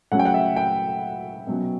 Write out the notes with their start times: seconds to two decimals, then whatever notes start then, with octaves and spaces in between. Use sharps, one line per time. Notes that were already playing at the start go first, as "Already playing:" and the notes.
0.12 C#3 F#3 A3 C#4 F#5
0.19 G5
0.25 F#5
0.34 E5
0.56 G5
1.47 B2 F#3 C#4